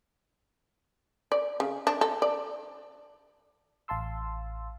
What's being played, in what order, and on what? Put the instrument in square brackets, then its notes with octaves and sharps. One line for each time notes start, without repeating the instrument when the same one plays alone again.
[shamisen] D5
C#3
D4
A4
D5
[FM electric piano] A1 F5 A5 C6 E6